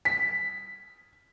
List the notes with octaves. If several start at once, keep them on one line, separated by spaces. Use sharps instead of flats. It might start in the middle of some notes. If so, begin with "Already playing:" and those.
B6